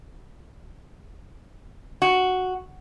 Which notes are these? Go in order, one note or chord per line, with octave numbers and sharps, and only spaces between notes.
F#4